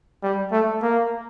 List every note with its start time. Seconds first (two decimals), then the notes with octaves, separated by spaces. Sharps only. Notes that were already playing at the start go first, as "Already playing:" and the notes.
0.23 G3
0.52 A3
0.82 A#3